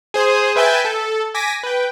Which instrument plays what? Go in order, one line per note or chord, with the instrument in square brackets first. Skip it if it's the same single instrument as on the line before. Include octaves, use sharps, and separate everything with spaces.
[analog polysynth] G#4 C5 D#6
B4 E5 G5 G#5 G6 A6
A4
G#5 D6 A#6 B6
B4 G5